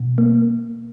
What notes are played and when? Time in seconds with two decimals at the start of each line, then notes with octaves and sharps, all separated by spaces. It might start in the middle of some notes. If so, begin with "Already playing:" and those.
Already playing: B2
0.18 A#3